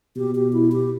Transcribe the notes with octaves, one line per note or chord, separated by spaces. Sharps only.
B2 G4
G4
E4
G4